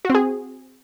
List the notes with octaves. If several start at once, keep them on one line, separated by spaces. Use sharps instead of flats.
C4 F#4 G#4